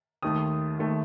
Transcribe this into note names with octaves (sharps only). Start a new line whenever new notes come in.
D#2 D#3 A3 D#6
D#2 D#3 A3